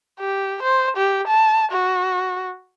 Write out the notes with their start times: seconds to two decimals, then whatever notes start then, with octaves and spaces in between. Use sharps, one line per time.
0.20 G4
0.63 C5
0.97 G4
1.27 A5
1.71 F#4